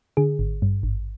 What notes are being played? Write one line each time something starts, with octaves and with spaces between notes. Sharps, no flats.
D3 G#4
G#1
G2
G#1